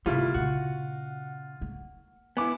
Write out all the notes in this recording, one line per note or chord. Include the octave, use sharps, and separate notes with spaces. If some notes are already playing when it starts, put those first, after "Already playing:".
C3 D#3 G3 A3 E4 F4
A#2 C#3 F#4
A#3
B3 E4 G#5 D6